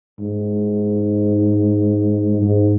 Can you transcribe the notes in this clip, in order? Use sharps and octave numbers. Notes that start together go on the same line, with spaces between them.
G#2
G#2